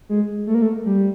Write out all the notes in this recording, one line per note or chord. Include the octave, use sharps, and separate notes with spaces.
G#3
A3
A#3
A3
G3